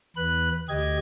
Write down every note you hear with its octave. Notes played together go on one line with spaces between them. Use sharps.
E2 B4 F#6
D2 G4 D#5 G#6